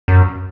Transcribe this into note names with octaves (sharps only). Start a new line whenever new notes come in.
F#2